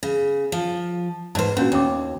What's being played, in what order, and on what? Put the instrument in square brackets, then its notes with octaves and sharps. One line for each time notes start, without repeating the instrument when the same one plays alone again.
[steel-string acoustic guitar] C#3
F3
[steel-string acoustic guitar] G#2 C5 [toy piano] B4 D5 A5
[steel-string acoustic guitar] A#2 [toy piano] C#4 D4 F#4
[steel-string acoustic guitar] D#2 [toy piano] C#4 G5 D6